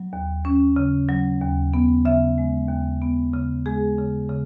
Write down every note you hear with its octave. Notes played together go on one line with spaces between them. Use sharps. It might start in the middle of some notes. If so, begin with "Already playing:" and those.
Already playing: F#3
D#2
C#4
C#3
F#3
D#2
B3
C#3 E5
G#3
D#2
B3
C#3
G#3 G#4
C#3
C#3